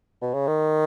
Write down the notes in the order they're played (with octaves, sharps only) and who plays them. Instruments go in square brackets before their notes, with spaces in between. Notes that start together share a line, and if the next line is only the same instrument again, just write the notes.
[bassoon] B2
C#3
D#3